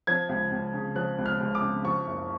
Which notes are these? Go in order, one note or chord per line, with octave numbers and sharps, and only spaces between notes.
F3 G#6
C#2
C#2
C#3
F3 F#6
C#2
F6
C#2
D6
C#3
F3 C#6
F#1